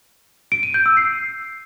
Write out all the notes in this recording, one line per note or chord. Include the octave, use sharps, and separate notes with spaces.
D7
D#7
G6
E6
C7